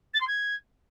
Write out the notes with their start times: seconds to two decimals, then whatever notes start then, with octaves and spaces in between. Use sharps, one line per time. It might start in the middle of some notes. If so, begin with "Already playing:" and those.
0.14 A6
0.20 C6
0.27 G#6